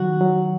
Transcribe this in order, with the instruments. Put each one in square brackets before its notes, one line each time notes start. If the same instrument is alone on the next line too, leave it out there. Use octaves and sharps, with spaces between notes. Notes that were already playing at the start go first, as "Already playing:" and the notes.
Already playing: [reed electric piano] D#3 F#3 [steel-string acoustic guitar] F#4
[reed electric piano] F#3